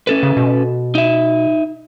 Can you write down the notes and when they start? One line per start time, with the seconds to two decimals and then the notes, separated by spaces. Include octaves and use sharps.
0.07 C#4 A4 B4
0.23 C#3
0.37 B2
0.95 D#4 E5